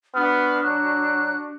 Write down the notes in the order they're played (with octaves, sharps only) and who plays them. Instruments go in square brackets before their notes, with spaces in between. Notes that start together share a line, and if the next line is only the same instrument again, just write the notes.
[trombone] B3 [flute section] D4 F#4 [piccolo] F6
[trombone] F#3 [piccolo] F#6